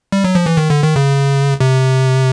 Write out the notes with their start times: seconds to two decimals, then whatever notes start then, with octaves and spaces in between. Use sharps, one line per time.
0.12 G3
0.24 F#3
0.35 F3
0.46 E3
0.57 D#3
0.70 D3
0.83 D#3
0.96 C#3
1.60 C3